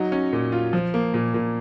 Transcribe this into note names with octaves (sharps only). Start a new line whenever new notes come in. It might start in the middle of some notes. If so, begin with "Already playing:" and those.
Already playing: F#3 D#4
C#4
A#2
F4
F3
A#3
A#2
A#2